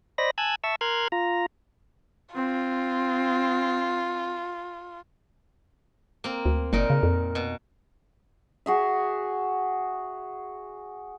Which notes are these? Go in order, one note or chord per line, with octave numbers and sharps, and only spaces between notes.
C5 D5 D#5 B5 A#6
G#5 A5 E6 F#6 G#6
E5 A5 C#6 E6
A#4 C6 F6 F#6 G#6
F4 A#5
C4 F4
A#3 C4
D2
F#1 A#2 D#4 A#4
C#3
F2
B2
F#4 G#4 E5